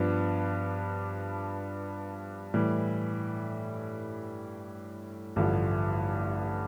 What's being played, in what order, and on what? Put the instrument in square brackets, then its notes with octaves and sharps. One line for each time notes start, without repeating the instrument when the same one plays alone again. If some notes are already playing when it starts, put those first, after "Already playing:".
Already playing: [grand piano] G2 F3 B3 D4
A2 E3 G3
A1 G2 D3 F3